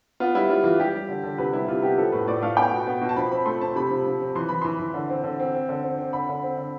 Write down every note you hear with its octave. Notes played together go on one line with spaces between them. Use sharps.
B3 F4
G3 E4
G3 F4
E3 F4
G3 G4
G3
D3
D3
C3 B4
G3 E4
C3 F4
B3 G4
F3 A4
A2 B4
A2 D5
A3 F5
B3 G5
B2
B3
B2
A5
F3 B5
C4 B5
A3 C6
C4 A5
C3 B5
F3
F3
C4
E3 C6
E3 B5
E3 C6
E3
D3
C4
D3
C4
C4
D3
C4
C4
D3 B5
D3
C4
D3